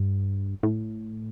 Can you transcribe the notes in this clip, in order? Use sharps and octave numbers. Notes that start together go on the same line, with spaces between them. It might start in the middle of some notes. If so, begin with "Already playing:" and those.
Already playing: G2
A2